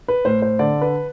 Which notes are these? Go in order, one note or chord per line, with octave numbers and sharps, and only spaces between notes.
B4
A2 C5
C5
D3 D5
B4